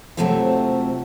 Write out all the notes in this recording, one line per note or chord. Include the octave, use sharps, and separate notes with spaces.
C3 F#3 A3 C4 F4 E5